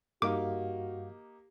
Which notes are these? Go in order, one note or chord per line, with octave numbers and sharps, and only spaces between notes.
G2 A#3 D#4 F#4 G4 F5 D6